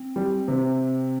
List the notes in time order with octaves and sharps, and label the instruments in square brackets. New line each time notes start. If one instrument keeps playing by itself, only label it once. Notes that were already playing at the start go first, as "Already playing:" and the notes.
Already playing: [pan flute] C4
[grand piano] G3
C3